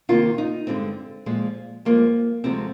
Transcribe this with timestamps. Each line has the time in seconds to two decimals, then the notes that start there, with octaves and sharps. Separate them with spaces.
0.09 D2 C3 D#3 A#3 F4
0.38 D#4
0.67 G2 D3 G#3 C4
1.26 A#2 F3 G#3
1.85 G2 F3 G#3 A#3
2.44 D2 C3 F3 G#3 C4